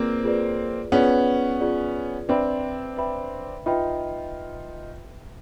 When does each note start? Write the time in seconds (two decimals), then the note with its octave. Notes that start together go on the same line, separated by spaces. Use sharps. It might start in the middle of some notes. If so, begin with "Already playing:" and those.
Already playing: A#3 C4 F4 G#4 B4 D5
0.24 F4 G#4 B4 D5
0.92 B3 C#4 F4 G#4 B4 D5
1.61 F4 G#4 B4 D5
2.29 C4 D4 B4 E5 G5 B5
2.97 B4 E5 G5 B5
3.66 D#4 F4 B4 E5 G5 B5